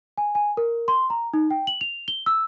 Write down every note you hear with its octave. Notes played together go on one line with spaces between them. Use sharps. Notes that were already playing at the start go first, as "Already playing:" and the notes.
G#5
G#5
A#4
C6
A#5
D#4
G5
F#7
F7
G7
E6